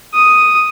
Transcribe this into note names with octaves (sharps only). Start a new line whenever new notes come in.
D#6